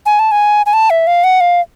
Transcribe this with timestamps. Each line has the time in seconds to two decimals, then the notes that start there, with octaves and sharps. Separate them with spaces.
0.06 G#5
0.19 A5
0.32 G#5
0.66 G#5
0.73 A5
0.90 E5
1.07 F5
1.24 F#5
1.41 F5